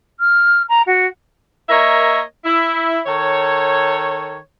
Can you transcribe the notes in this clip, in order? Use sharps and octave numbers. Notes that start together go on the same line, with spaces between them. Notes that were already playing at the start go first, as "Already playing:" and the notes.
F6
A#5
F#4
A#3 A#4 C#5 D#5 E5
E4
D#3 A4 C#5